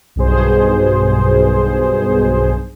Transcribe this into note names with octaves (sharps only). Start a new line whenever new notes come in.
B1 G2 B2 G#4 C5